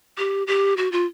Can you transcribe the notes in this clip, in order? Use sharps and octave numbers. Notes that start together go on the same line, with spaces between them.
G4
G4
F#4
F4